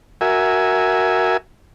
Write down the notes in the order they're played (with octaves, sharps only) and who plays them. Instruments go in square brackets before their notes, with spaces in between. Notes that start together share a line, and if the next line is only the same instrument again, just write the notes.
[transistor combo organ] F#4 A#4 E5 G#5